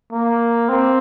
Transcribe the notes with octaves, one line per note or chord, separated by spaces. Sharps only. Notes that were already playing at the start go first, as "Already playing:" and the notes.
A#3
C4